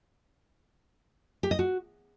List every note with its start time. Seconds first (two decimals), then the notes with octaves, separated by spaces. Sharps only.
1.43 G4
1.51 D#5
1.59 F#4